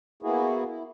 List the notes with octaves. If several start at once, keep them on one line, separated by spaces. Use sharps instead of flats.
A#3 B3 E4 F#4 G#4
E4